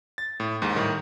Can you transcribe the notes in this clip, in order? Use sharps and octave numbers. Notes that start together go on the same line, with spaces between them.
A6
A2
D#2 G#2
A2 D#3 G3